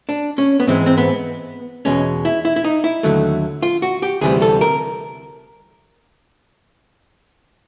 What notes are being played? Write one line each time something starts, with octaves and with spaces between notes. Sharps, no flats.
D4
C#4
B3
G#2 E3 G#3 C4
C4
B3
E2 B2 G#3 C#4
E4
E4
E4
D#4
E4
D#2 D3 F#3 A3
F4
F#4
G4
D2 C3 E3 G3 G#4
A4
A#4